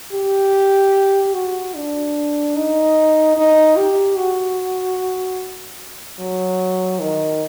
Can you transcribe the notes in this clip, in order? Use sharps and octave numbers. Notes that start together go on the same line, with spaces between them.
G4
F#4
D4
D#4
D#4
G4
F#4
F#3
D#3